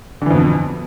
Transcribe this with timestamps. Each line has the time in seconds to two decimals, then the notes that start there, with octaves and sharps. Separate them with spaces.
0.22 D3
0.26 E3
0.31 F2
0.35 B2